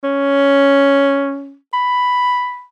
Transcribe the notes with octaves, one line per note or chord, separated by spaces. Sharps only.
C#4
B5